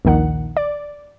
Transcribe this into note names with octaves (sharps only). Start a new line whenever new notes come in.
A#1 D#2 D#3 F#5
D5